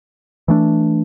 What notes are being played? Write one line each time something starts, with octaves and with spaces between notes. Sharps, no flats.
E3 A3 D4